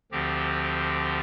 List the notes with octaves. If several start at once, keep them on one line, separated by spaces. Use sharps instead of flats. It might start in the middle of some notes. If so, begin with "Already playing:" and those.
D2 D3 F3 C4 G4